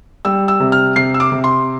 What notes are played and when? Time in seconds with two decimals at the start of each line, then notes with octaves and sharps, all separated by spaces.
0.25 G3 E6
0.48 E6
0.60 C3
0.72 F6
0.96 C3 C7
1.14 E6
1.20 D6
1.32 C3
1.44 C6